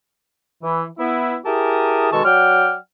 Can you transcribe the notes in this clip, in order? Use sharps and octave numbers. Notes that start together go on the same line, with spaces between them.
E3
B3 E4
E4 G4 G#4 A#4 A5 D#6
B2 D#3 G#3 A4 A5 C#6
F#3 D5 F#5 G5 F6